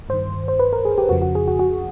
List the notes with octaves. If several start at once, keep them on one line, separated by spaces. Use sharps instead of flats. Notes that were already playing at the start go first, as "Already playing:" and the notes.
G2 D#3 C5
C5
B4
A#4
G#4
G4
F2 C#3 F3 F#4
F#4
G#4
F#4
F#4